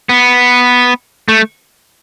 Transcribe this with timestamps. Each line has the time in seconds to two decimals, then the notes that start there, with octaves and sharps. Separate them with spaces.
0.09 B3
1.28 A3